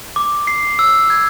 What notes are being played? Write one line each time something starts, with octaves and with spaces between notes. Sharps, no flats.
D6
C7
E6
G#6